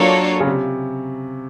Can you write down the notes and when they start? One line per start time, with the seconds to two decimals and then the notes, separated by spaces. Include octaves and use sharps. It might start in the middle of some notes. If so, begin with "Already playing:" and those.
Already playing: F#3 A#3 D4 F4 A4 C#5
0.40 C#3
0.47 C3